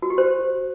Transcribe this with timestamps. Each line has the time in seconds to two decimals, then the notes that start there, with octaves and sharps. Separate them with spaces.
0.02 F#4
0.10 G4
0.18 C5